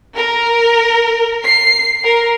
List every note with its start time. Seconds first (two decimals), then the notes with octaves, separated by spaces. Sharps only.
0.15 A#4
1.44 C7
2.04 A#4